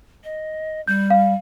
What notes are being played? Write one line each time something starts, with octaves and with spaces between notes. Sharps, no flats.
D#5
G3 G6
F5